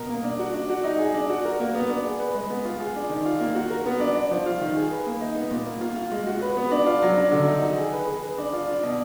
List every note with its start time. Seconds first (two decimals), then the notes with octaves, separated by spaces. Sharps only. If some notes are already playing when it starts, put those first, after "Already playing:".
Already playing: B2 A#4
0.09 A#3
0.24 D4
0.39 F#4
0.54 D4
0.70 F#4
0.84 D#4
0.99 G#4
1.14 D4
1.30 F#4
1.45 A#4
1.60 A#3
1.75 B3
1.89 D4
2.04 G#4
2.20 B4
2.35 G#3
2.50 B3
2.65 F4
2.80 G#4
2.96 D4
3.10 D#3
3.26 F4
3.40 A#3
3.55 F#4
3.70 A#4
3.86 B3
4.00 D4
4.16 D4
4.31 F3
4.46 F4
4.61 D#3
4.76 G#4
4.91 B4
5.06 A#3
5.21 D#4
5.36 B3
5.51 A#2
5.67 A#3
5.81 F4
5.96 F4
6.12 G#3
6.27 F#4
6.41 B4
6.57 B3
6.71 D4
6.86 F4
7.02 F#3
7.17 D4
7.32 D3
7.47 D#4
7.62 D#3
7.77 G#4
7.92 B4
8.07 G#4
8.22 B4
8.38 D4
8.53 F4
8.68 D4
8.83 B2